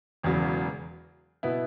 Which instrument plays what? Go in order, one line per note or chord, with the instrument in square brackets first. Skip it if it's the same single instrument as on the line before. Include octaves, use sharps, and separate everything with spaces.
[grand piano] E1 E2 C#3 F#3
B2 B3 E4